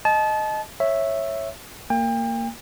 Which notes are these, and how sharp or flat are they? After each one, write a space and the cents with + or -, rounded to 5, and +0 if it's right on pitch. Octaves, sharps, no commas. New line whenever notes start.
D#5 +0 A5 -30
C#5 -10 E5 +0
A#3 -20 G5 +35